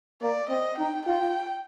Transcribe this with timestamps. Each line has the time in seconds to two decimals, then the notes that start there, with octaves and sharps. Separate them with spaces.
0.22 A#3 D5
0.50 C4 D#5
0.78 D#4 G5
1.06 F4 G5